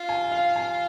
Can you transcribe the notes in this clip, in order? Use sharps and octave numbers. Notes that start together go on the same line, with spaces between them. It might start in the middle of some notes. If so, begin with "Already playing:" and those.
Already playing: F4
G#5
F5
G#5